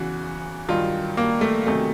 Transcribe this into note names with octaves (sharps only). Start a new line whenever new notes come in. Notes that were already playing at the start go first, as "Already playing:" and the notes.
Already playing: E2 C#3 E3 F#4
G2 D#3 F#3 F4
A#3
A3
E2 C3 D#3 F#3 A3